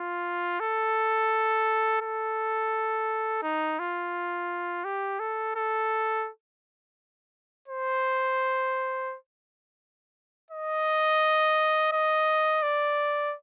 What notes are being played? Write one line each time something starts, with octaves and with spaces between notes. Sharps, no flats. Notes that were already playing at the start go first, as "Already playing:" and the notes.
Already playing: F4
A4
A4
D#4
F4
G4
A4
A4
C5
D#5
D#5
D5